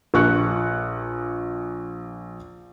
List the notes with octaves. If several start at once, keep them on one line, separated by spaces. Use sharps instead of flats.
A#1 C#6 F#6 C#7